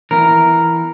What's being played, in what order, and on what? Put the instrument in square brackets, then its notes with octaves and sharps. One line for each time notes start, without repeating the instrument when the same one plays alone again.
[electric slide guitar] E3 B3 E4 [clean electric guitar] A#4